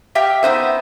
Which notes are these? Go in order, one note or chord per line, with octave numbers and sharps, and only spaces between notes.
G4 E5 F5 G5
B3 D#4 C5 E5